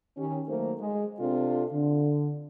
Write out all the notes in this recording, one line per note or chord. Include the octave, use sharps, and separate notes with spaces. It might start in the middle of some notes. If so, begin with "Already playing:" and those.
D#3 C#4 G4
D#3 F#3 A3 A#3 A#4 C5
G#3
C3 C4 D4 F4 A4
D3